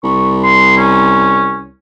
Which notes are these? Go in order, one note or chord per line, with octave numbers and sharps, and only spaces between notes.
C2 C#6
C6
C#4